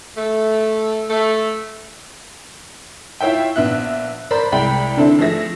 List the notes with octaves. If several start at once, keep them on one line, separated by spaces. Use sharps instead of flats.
A3
A3
E4 F4 C#5 E5 G5
A#1 B3 E5 F#6
A#4 C5 D5 A#5 B5
C2 G#3 D5 G5 B5
D3 C4 D4 E4 A4
F3 A3 G#4 E5 A#6